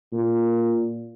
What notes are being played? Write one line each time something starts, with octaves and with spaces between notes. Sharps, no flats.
A#2